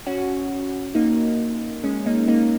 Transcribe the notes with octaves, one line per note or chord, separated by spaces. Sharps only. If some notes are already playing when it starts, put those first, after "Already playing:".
C#4 F#4
A#3 D#4
G#3 C#4
A#3 D#4
A#3 D#4